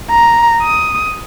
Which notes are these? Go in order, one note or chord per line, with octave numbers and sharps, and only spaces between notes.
A#5
D#6